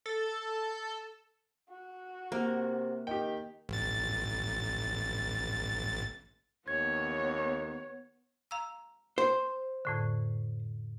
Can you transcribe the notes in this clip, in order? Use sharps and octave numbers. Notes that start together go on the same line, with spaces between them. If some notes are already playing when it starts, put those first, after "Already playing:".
A4
F#4
C3 A#3
D#3 G4 G5
A1 A6
D#2 B3 C#5 G#6
F5 A#5 E6
C5
F2 A2 D3